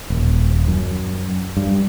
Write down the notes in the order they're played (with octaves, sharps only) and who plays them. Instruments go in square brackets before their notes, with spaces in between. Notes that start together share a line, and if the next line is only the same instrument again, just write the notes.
[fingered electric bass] D#1
F#2
G2